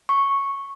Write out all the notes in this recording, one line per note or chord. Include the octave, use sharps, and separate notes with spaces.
C#6